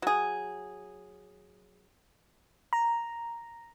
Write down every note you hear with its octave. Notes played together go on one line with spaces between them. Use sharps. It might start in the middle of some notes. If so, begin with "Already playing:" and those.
F#3 G#4
A#5